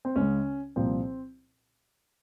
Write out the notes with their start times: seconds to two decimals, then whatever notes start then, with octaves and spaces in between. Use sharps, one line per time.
0.05 C4
0.16 C#2 C#3 G#3 C#4
0.76 C2 A#2 F3 C4